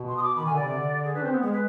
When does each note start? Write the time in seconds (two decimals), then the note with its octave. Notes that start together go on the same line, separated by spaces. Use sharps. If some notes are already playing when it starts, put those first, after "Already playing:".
Already playing: B2
0.08 C6
0.17 D#6
0.23 D6
0.37 D#3 B5
0.46 G#5
0.49 D3
0.56 C3 D5
0.74 D3
1.05 G#4
1.14 D4 B4
1.24 C4 C5
1.34 B3
1.43 G#3 G#4
1.53 B4